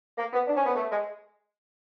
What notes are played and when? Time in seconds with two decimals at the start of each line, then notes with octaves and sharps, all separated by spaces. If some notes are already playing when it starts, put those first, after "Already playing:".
0.17 A#3
0.32 B3
0.46 D4
0.56 C#4
0.65 B3
0.75 A3
0.89 G#3